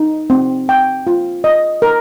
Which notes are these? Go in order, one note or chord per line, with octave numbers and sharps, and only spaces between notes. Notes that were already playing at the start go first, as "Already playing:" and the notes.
Already playing: D#4
C4
G5
F4
D#5
A#4